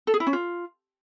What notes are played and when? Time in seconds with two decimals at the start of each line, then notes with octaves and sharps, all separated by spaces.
0.07 A4
0.14 G#4
0.20 E4
0.27 C#4
0.33 F4